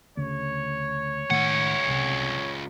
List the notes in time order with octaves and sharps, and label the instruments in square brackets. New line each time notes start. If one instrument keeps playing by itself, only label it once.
[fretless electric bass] D2 C#3 [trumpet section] C#5
[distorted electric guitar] C#2 F#5 [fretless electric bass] A2 D#3 A3
[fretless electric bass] C2 C3